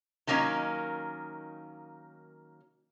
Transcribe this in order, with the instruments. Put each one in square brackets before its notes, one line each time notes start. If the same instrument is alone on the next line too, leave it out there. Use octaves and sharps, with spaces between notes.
[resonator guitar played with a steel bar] D#3 F#3 A#3 C#4 D#4